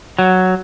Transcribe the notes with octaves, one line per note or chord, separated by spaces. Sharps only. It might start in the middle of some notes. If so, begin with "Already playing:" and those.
F#3